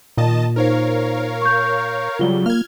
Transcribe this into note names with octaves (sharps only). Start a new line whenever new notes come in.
A#2 D#3 D#5 A5
D#4 A#4 C5 C#5 F5
C#6 G6
C#3 F#3 G3 F4 G7
A#3 F6 G#6